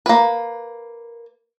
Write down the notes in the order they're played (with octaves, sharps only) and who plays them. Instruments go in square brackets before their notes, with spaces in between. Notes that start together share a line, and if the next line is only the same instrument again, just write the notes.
[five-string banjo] A#3 B4